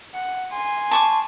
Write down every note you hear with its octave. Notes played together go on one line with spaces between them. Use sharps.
F#5
G#5 C6
A5 C#6 D6